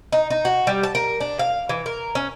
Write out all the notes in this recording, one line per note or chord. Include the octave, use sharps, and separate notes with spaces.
D#4
D#4
F#4
G3
A5
A#4
D4
F5
E3
A#4
C#4